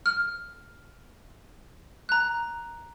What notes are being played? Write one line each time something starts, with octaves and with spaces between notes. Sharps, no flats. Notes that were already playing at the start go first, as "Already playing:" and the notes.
F6
A#5 F#6